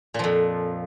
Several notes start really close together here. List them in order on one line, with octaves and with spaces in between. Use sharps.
A#2 F3 F2